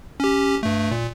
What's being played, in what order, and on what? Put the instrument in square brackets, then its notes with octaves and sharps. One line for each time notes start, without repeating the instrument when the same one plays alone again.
[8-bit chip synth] C#4 G4
G2 A3
A#2